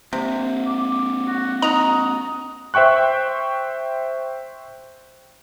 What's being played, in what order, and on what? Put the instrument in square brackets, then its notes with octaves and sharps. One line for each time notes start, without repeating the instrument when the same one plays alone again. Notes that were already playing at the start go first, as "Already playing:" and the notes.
[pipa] C3 [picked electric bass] A#3 C4
[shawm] D6
F#4
[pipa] D#4 F#4 [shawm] D#5 [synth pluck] A#5
[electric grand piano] C5 E5 G5 C#6 F#6